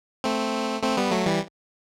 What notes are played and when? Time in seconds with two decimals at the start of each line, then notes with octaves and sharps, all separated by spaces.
0.24 A3 C4
0.82 A3 C4
0.97 G3 B3
1.11 F#3 A3
1.26 E3 G3